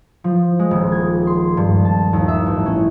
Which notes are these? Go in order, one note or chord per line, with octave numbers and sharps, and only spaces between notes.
F3
G#3
D#1
G#6
C6
G2
A5
D#2
E5
A1
C#4